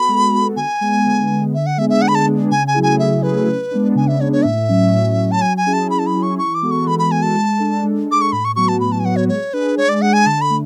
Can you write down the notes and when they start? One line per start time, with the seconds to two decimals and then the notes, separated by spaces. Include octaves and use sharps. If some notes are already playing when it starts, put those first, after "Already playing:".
Already playing: B3 F#4 A4 B5
0.08 G#3
0.33 B3 F#4 A4
0.56 D3 G#5
0.81 G#3 B3
1.05 D3
1.30 G#3 B3
1.54 D3 E5
1.66 F#5
1.77 G#3 B3 D4 G#4 E5
1.90 E5
2.02 D3 F#5
2.08 B5
2.15 A5
2.27 G#3 B3 D4 G#4
2.51 C#3 G#5
2.67 G#5
2.74 F#3 A3 E4 G#4
2.83 G#5
2.99 C#3 E5
3.23 F#3 A3 E4 G#4 B4
3.47 C#3
3.71 G#3 B3 D4
3.95 C#3 G#5
4.08 E5
4.21 G#3 B3 D4 C#5
4.33 C#5
4.44 A2 E5
4.69 F#3 C#4
4.93 A2
5.18 F#3 C#4
5.31 A5
5.42 F#3 G#5
5.57 G#5
5.66 C#4 E4 G#4
5.73 A5
5.90 F#3 B5
5.99 A5
6.07 B5
6.14 C#4 E4 G#4
6.23 C#6
6.38 E3 C#6
6.55 D6
6.63 G#3 B3 F#4 A4
6.71 C#6
6.86 E3 B5
6.99 B5
7.10 G#3 B3 F#4 A4 G#5
7.22 A5
7.35 G#3
7.59 D4 A4
7.83 G#3
8.08 D4 A4 D6
8.21 C#6
8.32 A2 B5
8.45 C#6
8.56 F#3 B3 F#4 C#6
8.68 A5
8.80 A2 B5
8.92 A5
9.00 G#5
9.04 F#3 B3 F#4 F#5
9.16 C#5
9.28 G#3 C#5
9.53 D4 G#4 B4
9.77 G#3 C#5
9.89 D5
10.02 D4 G#4 F#5
10.13 G#5
10.26 D3 A5
10.41 B5
10.50 A3